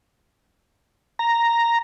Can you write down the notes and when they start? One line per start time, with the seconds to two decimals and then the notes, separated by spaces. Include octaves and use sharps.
1.19 A#5